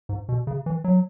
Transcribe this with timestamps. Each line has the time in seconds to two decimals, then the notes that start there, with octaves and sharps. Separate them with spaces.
0.09 G#2
0.29 B2
0.47 C#3
0.66 E3
0.84 F#3